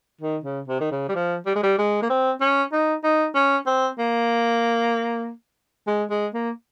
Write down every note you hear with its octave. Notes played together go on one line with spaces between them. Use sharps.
D#3
C#3
C3
D#3
C#3
G3
F3
G3
G#3
G3
G#3
A#3
C4
C#4
D#4
D#4
C#4
C4
A#3
G#3
G#3
A#3